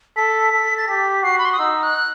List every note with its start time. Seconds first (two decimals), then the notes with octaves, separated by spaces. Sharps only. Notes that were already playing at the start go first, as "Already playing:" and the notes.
0.16 A4 B6
0.52 A4
0.77 A6
0.88 G4 B6
1.23 F#4 C7
1.38 B5
1.45 C6
1.53 D#6
1.59 D#4 E6
1.83 F#6